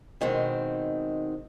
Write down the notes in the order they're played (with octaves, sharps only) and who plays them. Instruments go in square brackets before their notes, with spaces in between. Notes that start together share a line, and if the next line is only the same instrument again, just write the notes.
[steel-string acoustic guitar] B2 D#3 G#3 C4